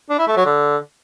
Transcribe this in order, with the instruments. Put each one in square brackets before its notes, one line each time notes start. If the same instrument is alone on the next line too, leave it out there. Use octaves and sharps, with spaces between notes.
[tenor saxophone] D4
E4
A3
F#3
D3